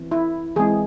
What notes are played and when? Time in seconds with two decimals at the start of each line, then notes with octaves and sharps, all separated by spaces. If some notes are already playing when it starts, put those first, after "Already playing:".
Already playing: E3 C4
0.11 E4
0.56 E3 G#3 C4 G#4